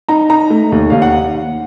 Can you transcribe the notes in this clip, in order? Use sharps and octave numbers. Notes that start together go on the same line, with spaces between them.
D#4 A#5
D#4 A#5
A3
D#2
D#2 F5
F#5